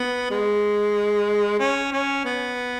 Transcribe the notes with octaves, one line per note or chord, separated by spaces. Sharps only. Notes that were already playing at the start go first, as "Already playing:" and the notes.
Already playing: B3
G#3
C#4
C#4
B3